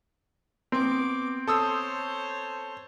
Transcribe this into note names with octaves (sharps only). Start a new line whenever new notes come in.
B3 C4 D6
A4 C5 C#5 D#6 E6